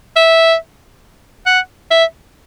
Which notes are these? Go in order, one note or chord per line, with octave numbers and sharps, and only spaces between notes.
E5
F#5
E5